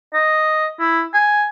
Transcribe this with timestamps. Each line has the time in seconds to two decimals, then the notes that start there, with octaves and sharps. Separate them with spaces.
0.14 D#5
0.80 E4
1.14 G#5